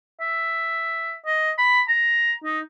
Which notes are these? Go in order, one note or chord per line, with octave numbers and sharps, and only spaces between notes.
E5
D#5
B5
A#5
D#4